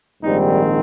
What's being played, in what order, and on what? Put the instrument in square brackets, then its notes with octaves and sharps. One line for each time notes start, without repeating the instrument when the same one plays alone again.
[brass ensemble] A#1 G#2 D#3 G3 C4 D#4